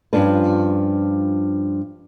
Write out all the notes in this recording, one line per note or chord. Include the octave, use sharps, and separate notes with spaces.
G2 F3 C#4 D4 F4 B4